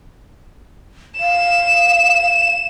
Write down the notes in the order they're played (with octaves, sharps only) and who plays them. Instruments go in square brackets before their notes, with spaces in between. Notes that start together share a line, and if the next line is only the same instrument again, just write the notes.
[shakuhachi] F5 [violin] E7